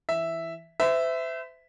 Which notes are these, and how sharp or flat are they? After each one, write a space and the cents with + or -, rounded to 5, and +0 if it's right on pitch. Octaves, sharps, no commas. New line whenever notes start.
E3 +5 E5 +0
C5 -40 E5 +0